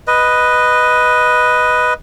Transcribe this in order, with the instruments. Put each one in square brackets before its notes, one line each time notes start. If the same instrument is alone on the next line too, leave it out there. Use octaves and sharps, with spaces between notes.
[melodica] B4 D#5